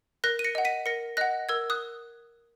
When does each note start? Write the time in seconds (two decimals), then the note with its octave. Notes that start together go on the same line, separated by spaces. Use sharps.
0.24 A#4 F#6 A#6
0.39 D#7
0.44 A#6 C#7
0.55 D#5 F#5
0.65 B6 D#7
0.86 A#4 A#6 C#7
1.17 D#5 F#5 F#6 A#6
1.49 A#4 E6 G#6
1.70 D#6 F#6